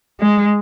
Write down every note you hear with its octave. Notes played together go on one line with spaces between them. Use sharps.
G#3